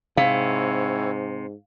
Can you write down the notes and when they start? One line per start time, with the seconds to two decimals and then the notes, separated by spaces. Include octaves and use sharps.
0.17 G#2 C3 C4 E4 C#5 F5